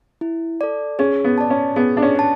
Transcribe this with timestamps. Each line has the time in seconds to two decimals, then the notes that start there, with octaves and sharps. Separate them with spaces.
0.21 E4
0.61 A4 D5
0.99 C#4 G#4
1.24 B3
1.38 D5 A5
1.50 C#4
1.76 B3 G#4
1.97 D4
2.02 C#4
2.16 D5 A5